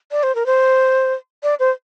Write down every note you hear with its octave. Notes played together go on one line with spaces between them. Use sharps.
D5
C5
A#4
C5
D5
C5